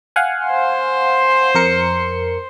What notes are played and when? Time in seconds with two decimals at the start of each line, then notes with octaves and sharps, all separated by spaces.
0.16 F5 F#5 G#5
0.47 C5 C6
1.55 F2 A#4 C#7